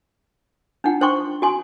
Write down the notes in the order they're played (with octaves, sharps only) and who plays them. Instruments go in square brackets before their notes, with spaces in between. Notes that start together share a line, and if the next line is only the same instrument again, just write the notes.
[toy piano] D4 D#4 F4 F#5 G5
D4 C5 F#5 G5 C6 C#6
F#4 G#5 C6